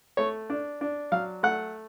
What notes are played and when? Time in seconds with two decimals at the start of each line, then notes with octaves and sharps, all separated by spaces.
0.17 A3 C#5
0.50 D4
0.81 D4
1.12 F#3 F5
1.43 A3 F#5